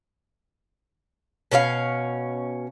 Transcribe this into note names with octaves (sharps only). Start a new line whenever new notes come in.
B2 C#4 A#4 F5